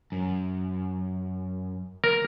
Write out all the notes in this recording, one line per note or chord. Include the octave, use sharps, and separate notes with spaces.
F#2
A#4